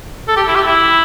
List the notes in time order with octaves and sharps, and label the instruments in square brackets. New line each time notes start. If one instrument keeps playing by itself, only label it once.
[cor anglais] A4
G4
E4
G4
E4